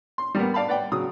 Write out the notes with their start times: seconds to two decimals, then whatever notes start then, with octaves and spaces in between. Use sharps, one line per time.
0.18 C6
0.35 G3 A#3 B3
0.54 D5 F5 A5 B5
0.68 B4 D5 F#5 G5
0.92 C#3 F#3 D#6